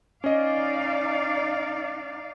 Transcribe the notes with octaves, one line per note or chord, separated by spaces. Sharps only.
C#4 D#4 D5 D#5 F5